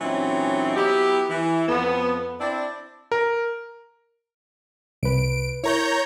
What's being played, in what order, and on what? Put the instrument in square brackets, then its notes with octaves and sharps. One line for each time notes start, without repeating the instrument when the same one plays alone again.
[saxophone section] A#2 E3 F#3 C4 C#4 D#4
F#3 B3 E4 G4
E3
F2 B3
C4 D4 E4 D5
[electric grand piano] A#4
[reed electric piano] C2 B4 [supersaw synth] D7
[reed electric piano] E4 A#4 [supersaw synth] C#5 A#5 G6